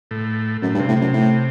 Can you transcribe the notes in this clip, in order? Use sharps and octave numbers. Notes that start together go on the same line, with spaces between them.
A2
F#2 A2
G2
C3
A2
F#2 C3
A2